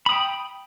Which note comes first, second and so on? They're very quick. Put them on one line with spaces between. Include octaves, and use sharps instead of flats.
B5 D#6 G5